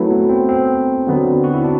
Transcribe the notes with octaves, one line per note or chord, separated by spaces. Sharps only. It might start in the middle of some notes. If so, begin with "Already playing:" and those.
Already playing: F#3 A3 C4 E4 B4
B3
C4
C4
D3 F#3 B3
F#4
E4
D4